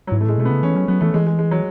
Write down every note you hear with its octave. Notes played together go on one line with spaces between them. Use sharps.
F#3
G#2 E3
A3
A2 G#3
B2 A3
C#3 B3
E3 C#4
F#3 C#4
F#3 B3
E3 A3
E3 G#3
G#3
G#3
F#3